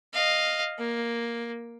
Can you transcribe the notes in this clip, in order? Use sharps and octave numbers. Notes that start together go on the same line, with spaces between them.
D#5 F5
A#3